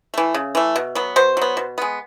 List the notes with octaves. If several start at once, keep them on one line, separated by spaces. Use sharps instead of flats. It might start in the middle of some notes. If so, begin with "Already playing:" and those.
E3 A3
C#3
E3 A3
B2
F#3 B3
B2 C5
F#3 B3
B2
G#3 B3